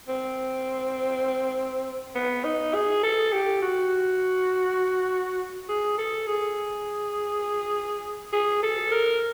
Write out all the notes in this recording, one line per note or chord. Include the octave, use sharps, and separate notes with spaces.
C4
B3
D#4
G#4
A4
G4
F#4
G#4
A4
G#4
G#4
A4
A#4